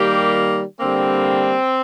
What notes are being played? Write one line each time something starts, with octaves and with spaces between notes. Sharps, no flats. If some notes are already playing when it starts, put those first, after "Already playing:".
Already playing: D#3 G3 A#3 G4
D3 G3 A#3 C4